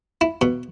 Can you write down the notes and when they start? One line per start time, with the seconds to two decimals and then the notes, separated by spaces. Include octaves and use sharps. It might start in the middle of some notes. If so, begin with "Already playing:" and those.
0.21 E4
0.41 B2